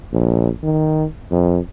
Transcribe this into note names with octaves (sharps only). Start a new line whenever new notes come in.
A#1
D#3
F2